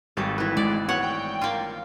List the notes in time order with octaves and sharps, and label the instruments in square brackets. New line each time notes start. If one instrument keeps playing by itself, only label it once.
[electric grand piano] G#1 [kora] G3 A3 F5
[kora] E3 B4
[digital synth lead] G#3 [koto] D5
[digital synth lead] B3 [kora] C#5 [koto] F#5
[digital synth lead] G5
[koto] A#3 F4